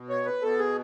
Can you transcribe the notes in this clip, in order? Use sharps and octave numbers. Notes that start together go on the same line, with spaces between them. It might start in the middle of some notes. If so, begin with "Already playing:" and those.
Already playing: B2
C#5
B4
B2 A4
G#4